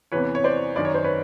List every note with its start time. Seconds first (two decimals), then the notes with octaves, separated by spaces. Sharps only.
0.12 E2 C3 E3 B4 C#5
0.35 C#5
0.44 C5 D5
0.76 F#2 D#3 D5
0.85 C#5
0.94 C5
1.04 B4 C#5